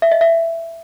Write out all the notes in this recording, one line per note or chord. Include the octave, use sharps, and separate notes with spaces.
E5
D#5
E5